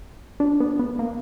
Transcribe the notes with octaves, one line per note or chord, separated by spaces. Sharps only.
D4
B3
B3
A#3